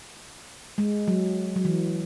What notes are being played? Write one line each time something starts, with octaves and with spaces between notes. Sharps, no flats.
G#3
F#3
F#3
E3